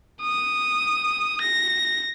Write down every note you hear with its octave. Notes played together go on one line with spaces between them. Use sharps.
D#6
A#6